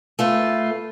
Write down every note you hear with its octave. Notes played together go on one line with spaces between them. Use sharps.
A3 F4 B4